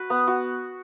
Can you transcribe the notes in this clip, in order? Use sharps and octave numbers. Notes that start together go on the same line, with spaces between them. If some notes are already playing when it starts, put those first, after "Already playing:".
Already playing: F#4 B4
B3
F#4